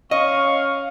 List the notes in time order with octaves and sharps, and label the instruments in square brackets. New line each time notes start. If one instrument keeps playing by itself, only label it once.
[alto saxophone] C#4 [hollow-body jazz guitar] D#5 [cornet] F5 [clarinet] C#6